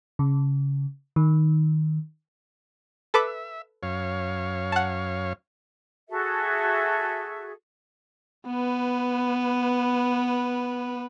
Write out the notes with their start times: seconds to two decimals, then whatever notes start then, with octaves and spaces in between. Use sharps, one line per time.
0.19 C#3
1.16 D#3
3.14 A4 B4 E5 D6
3.83 F#2 C#5 F5
4.72 F#5 A5
6.09 F#4 G#4 A4 E5
8.47 B3 B4